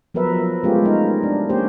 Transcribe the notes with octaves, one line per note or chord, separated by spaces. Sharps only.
F3 F#3 B3 A#4 B4 E5
G#3 A3 B3 C#4 F4 G4
D#4 A#4
D4
A#3 C#4 G4 C5